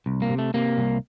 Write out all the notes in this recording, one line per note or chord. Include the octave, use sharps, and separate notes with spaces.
C2
A#3
C3
A3
C3 A#3
C2